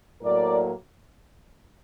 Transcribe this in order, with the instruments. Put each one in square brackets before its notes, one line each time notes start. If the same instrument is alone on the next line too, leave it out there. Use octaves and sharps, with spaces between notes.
[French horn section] A2 F#3 A#3 A#4 D5